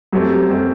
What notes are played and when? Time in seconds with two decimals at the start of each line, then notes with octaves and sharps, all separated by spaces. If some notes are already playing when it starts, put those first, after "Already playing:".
0.12 F#2 F#3 A3 C4 G4
0.49 F#2 F#3 A3 C4